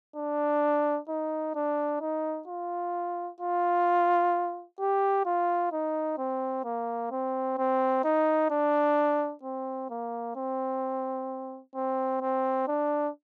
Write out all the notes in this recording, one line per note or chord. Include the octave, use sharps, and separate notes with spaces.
D4
D#4
D4
D#4
F4
F4
G4
F4
D#4
C4
A#3
C4
C4
D#4
D4
C4
A#3
C4
C4
C4
D4